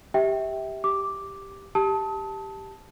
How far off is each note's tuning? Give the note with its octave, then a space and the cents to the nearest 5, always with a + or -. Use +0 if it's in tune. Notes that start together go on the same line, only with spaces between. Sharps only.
G4 +0 E5 -25 G5 +0
G4 +0 D6 +0
G4 +0 A5 +0 D#6 +40